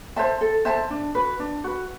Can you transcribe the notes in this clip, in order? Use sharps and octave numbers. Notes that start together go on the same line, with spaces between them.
C5 E5 A5
A4
C5 E5 A5
D4
F#4 B4
D4
F#4 B4